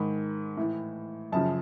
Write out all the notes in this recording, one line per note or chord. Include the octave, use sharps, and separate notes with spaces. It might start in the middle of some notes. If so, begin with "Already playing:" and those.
Already playing: G#2 D#3 B5
A2 E3
F#2 C#3 F3 A5